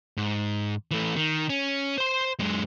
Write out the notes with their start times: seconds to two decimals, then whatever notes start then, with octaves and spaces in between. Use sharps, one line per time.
0.17 G#2
0.91 E3 A3
1.16 D#3
1.49 C#4
1.98 C5 C6
2.39 F#2 G#3